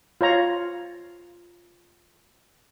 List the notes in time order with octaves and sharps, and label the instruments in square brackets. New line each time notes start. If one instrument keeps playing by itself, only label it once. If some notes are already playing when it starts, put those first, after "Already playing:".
[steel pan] F4 C#5 A#5